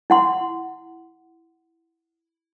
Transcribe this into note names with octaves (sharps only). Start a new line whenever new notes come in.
E4 F#5 C6